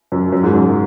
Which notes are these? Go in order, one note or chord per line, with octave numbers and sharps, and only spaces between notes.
F#2
F#2
G#2
F#2